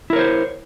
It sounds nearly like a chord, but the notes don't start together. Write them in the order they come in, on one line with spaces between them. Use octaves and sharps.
E4 A#4 C#5 C5